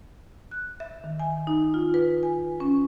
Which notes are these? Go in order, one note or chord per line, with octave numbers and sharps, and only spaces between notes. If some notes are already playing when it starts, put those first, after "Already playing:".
F#6
E5
D#3
G#5
D#4
F4
B4
G#5
C#4